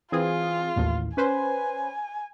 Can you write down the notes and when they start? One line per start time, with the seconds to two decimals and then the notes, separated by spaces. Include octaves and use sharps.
0.12 E3 C4 F4 G#4
0.76 A1 D#2 A2
1.17 C#4 B4 C5 G#5